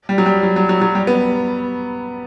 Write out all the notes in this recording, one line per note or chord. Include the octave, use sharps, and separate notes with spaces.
G3
F#3
G3
F#3
F#3
F#3
F#3
G3
B3